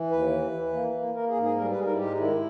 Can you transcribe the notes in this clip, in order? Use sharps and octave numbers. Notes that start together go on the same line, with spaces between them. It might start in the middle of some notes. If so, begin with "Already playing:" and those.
Already playing: E3
D#2 B4
E3
E3
A#3
A#3
A#3 A#4
G#4
G#2
G#4
G3 A#4
B4
G#2 G#4
A#4
E4
G#3 G4
D#4
D#3 E4